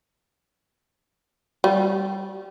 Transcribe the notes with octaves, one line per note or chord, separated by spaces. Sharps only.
G3